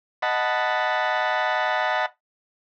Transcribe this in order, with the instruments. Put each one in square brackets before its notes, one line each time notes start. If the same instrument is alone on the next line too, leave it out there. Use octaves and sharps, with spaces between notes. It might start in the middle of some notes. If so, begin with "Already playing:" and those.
[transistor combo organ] D#5 F#5 A5 B5